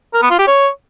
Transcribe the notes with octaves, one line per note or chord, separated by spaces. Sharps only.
A#4
B3
F4
G4
C#5